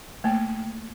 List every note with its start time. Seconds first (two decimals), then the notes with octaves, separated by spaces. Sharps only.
0.24 A3 A#3